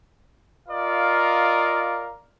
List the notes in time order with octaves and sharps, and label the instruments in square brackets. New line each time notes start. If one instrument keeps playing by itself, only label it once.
[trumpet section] F4 A#4 D5 D#5 F5